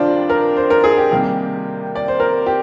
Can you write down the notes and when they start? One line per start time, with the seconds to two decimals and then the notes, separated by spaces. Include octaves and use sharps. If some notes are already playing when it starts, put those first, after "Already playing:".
Already playing: F2 C3 D#3 G3 D4 F4 C5 D5
0.30 A#4
0.57 C5
0.70 A#4
0.84 G#4
0.97 G4
1.11 C3 D#3 G3 A#3
1.95 D5
2.08 C5
2.20 A#4
2.46 G4